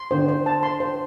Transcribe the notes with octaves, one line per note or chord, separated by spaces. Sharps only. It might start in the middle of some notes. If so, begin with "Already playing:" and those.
Already playing: C6
D3 C5
C5
A5
C6
C5